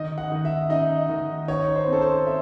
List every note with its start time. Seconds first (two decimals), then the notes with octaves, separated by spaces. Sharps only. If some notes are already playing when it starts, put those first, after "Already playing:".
Already playing: D#3 D#5
0.18 F#5
0.32 D#3
0.45 E5
0.70 D#4 D#5
1.09 D#3
1.48 D#4 C#5
1.75 C5
1.88 C4 A4
2.01 C5
2.26 E5